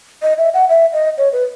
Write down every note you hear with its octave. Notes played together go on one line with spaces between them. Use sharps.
D#5
E5
F#5
E5
D#5
C#5
B4